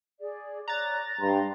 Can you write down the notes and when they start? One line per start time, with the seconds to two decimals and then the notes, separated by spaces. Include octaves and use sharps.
0.20 G#4 D5
0.68 C#5 D5 A#5 F#6 A6
1.21 G2 G5 C6